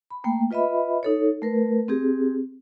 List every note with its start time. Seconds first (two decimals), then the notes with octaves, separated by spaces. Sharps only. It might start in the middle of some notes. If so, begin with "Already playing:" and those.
0.10 B5
0.24 A3 A#3 G5
0.51 F4 B4 D#5 E5 B5
1.03 D#4 A4 C#5
1.42 A3 A#4 B4
1.88 C4 G4 G#4